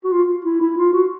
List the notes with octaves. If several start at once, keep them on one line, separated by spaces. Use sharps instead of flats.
F#4
F4
E4
E4
F4
F#4